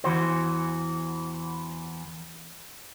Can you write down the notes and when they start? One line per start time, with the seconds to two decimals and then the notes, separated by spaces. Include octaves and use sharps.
0.04 E2 E3 F#4 C5